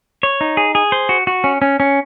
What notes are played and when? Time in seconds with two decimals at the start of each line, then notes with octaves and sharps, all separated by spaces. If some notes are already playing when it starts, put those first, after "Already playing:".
0.23 C#5
0.41 D#4
0.57 G#4
0.75 G#4
0.92 C5
1.09 F#4
1.27 F#4
1.44 C#4
1.62 C#4
1.80 C#4